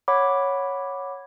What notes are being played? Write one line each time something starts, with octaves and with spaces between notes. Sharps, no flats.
C#5 F#5 B5 D6